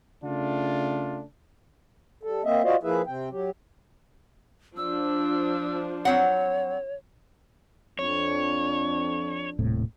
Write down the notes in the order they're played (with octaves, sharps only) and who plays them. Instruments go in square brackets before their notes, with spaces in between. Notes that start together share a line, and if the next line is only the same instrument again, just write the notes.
[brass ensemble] C#3 A3 D4 F4
[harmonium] G3 A4
A#3 C4 D#5 E5
F4 F#4 C5 D5 D#5 F5
F3 A#3 E4 G#4 B4 E5
C3 C4 G5
F#3 G4
[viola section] F3 D4 [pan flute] E6
[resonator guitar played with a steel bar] F#3 C4 F#5 [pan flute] C#5
[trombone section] F2 D4 [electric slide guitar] C#5
[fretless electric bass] D#1 A2 C3